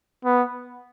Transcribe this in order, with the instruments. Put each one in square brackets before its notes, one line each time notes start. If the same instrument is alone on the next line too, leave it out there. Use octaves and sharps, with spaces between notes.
[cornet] B3